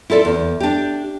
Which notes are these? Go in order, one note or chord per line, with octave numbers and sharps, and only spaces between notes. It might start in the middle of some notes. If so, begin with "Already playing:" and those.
E4 F4 A4 D5
E2
D4 G4